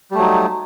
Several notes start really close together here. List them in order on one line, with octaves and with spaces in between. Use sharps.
G3 A3 F#3 D#4